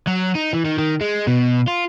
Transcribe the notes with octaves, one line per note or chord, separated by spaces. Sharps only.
F#3
D#4
E3
D#3
D#3
G#3
B2
F4